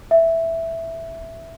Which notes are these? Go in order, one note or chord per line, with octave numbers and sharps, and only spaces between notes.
E5